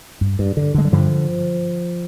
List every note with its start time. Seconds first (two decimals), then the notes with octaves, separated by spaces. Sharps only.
0.21 G2
0.39 G2
0.57 D3
0.74 D3 G#3
0.85 G3
0.92 G2 D3 F3